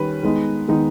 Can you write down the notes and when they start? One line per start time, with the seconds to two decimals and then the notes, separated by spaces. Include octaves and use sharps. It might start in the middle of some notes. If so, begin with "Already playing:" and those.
Already playing: D#3 G3 C#4 B4
0.23 D#3 G#3 B3 D#4
0.68 D#3 G#3 B3 D#4